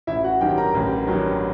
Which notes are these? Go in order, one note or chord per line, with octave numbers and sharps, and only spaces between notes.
A1 E4 E5
F#4 F#5
G2 D#3 F#3 G4 G5
A#4 A#5
A1
G2 D#3 F#3